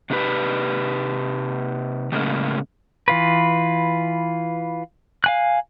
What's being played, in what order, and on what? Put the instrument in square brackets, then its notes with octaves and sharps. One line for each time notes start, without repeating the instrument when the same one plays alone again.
[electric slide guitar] C3 D4 D#4 G4 B4
A2 C#3 G#3 A#3 C#4
[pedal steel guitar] E3 F4 B4
F5 G#5 F#6